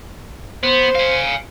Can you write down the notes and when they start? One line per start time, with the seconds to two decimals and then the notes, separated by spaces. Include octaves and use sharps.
0.63 B3 C5
0.95 F5 G#5